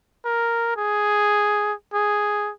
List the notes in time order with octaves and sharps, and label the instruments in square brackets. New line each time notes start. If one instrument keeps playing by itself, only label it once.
[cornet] A#4
G#4
G#4